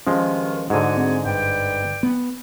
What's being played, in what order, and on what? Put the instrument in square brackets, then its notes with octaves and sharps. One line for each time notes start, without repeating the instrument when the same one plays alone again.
[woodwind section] G2 D#3 [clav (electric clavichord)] F3 G#3 [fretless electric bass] C#4
[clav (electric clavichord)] G#2 D3 [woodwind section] F#4 G#4 G#5
[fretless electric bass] C4
[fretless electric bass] G1 [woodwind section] B4 D5 G5
[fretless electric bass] B3